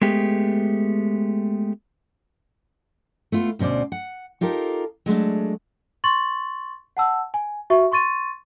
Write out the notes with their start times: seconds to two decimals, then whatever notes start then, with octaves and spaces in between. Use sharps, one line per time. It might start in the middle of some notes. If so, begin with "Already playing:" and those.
0.02 G#3 A3 B3 G4
3.32 A3 B3 F4
3.59 D2 B2 C#4 C5 D5
3.92 F#5
4.41 D#4 F4 G4 A4 A#4
5.06 F#3 G#3 A3 D4
6.04 C6 C#6 A6 F#7
6.97 F#5 A5 E6
7.34 G#5
7.70 F#4 E5 C#6
7.92 C6 C#6 A6 D#7